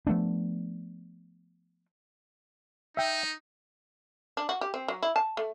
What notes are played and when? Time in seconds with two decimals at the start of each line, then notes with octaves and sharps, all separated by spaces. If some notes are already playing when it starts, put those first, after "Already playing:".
0.07 F3 A3 B3 D4
2.97 D#4 E5 G5
4.37 D4
4.49 F#4
4.61 G4
4.74 C4
4.88 F#3
5.02 E4
5.16 A5
5.37 A3